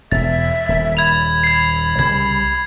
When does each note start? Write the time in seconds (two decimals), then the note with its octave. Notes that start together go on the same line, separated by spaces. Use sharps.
0.12 E1 E5 A6
0.69 D#1
0.97 B5 G#6 F7
1.44 G#6 C7
1.99 C2 C#3 G3 G#6